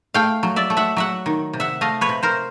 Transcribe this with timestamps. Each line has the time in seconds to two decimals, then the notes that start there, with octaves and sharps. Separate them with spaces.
0.14 A3 F5 G5
0.43 F#3
0.56 D5 E5
0.70 A3
0.77 E5 F#5
0.97 F#3 E5 F#5
1.26 D#3
1.53 C3
1.60 E5 F#5
1.81 A3 D#5 F5
2.01 B4 C#5
2.09 C3
2.23 A#4 C5